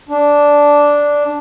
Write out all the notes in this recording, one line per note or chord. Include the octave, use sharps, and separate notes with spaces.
D4